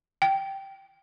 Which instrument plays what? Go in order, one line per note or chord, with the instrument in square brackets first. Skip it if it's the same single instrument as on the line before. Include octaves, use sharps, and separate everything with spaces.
[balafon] G5